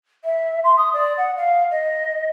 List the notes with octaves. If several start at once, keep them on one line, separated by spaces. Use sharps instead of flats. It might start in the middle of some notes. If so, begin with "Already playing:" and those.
E5
C6
D#6
D5
F#5
F5
D#5